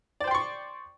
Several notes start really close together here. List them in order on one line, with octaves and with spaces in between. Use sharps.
D5 C5 G5 C6 C#6